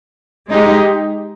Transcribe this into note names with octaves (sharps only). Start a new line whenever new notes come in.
G#3 D#4 G4